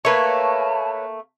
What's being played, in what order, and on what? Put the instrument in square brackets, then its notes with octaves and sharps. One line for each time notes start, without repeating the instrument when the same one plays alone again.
[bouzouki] A3 A#3 [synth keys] B4 C#5 [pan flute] A5